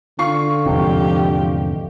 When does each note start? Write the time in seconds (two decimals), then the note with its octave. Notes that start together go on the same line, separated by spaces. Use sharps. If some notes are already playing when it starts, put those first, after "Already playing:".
0.19 D3 F4 C#6 C7
0.66 E2 G#2 C3 F3 G4